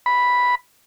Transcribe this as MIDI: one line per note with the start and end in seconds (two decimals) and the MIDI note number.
0.06 0.55 83